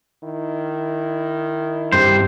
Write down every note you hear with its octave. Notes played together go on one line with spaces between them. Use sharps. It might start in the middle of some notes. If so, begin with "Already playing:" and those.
D#3 E4
G2 C4 G4 C5